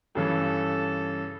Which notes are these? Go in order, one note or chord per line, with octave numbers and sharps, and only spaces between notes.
G2 C#3 E3 A4